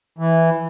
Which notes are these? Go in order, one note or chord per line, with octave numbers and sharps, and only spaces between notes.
E3